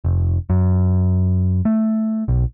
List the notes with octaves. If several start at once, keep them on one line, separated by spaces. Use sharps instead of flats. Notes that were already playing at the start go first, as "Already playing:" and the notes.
F1
F#2
A3
B1